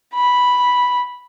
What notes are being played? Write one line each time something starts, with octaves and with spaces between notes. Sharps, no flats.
B5